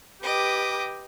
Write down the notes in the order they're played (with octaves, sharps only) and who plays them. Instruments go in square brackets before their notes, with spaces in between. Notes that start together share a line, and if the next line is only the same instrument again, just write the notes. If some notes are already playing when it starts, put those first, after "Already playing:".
[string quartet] G4 B4 G5 [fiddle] D#5 D6